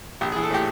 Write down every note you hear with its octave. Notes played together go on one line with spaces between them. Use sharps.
A#1 G4
G#4
E3
A4
A2 G4